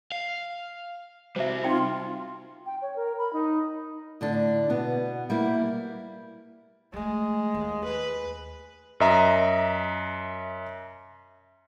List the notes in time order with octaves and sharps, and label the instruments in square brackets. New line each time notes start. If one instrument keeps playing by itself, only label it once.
[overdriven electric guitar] F5
[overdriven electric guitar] C3 G3 [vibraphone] F#4 [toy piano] C5 E5
[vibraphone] C4 [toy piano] D#4 G5 B5 [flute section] F4
[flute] G5
C#5
A#4
B5
D#4
[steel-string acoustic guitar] A2 D3 D4
B2 B3
G3 A#3 E4
[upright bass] F3 A3 [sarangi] G#3
[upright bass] D#2
[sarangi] B4
[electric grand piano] F#2 D#5 E5 A#5